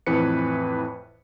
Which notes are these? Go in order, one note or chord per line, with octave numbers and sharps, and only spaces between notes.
F2 A2 E3 B4 C#7